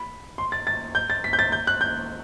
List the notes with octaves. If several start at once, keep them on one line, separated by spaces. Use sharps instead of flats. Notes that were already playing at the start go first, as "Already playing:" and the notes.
Already playing: B5
C6
A6
A6
G6
A6
B6
G6
A6
G6
F#6
G6